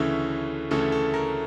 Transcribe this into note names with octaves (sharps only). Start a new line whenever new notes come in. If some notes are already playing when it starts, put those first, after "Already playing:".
Already playing: D2 C#3 E3 A3 C#4 E4
D2 C#3 E3 A3 C#4 A4
A4
A#4